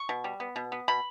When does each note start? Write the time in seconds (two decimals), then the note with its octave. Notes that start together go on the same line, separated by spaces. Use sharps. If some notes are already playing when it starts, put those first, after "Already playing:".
Already playing: C#6
0.09 B2
0.24 G3
0.40 B3
0.56 B2
0.72 B3
0.88 B2 B5